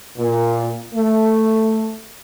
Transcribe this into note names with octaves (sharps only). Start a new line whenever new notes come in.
A#2
A3